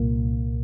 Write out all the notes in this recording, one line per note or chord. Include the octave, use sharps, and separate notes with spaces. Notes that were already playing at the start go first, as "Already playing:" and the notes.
Already playing: C2 A#2 A#3